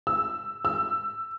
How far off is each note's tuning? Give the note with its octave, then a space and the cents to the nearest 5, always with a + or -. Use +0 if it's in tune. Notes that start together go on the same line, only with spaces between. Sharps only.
E6 +0
E6 +15